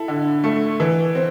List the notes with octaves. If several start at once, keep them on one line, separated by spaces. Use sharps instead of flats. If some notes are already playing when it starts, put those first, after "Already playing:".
Already playing: E4 A4
D3
A3
E3
C4